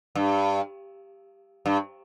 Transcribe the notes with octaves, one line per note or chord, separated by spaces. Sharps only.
G2
G2